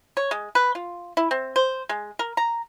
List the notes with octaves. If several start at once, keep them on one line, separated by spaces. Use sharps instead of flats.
C#5
G#3
B4
F4
E4
C4
C5
G#3
A#4
A#5